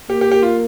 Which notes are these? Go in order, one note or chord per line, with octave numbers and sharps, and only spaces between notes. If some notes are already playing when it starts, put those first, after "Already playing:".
A#3 G4
G4
G4
F4